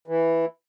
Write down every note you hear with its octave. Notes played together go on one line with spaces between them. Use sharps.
E3